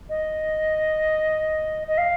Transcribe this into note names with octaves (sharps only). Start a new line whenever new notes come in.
D#5
D#5
F5